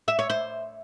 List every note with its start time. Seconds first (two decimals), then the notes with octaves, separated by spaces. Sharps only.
0.08 E5
0.19 C#5
0.30 C5